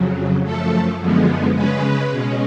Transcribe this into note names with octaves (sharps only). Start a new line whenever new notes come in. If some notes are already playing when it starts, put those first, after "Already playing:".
Already playing: F2 C#3 F#3
F#2 F3 A3 A4
F#2 D3 F3 G#3 B3
C#3 G#3 C#4 B4
B2 G#3 C#4